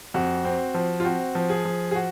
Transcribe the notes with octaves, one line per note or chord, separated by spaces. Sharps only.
F2 F#4
C4
F3
F4
C4 F#4
F3
G#4
F3
G#4
F#4